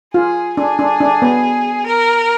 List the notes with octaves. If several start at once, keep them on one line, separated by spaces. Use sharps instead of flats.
F4 G#4
D4 G#4
D4
D4
B3
A#4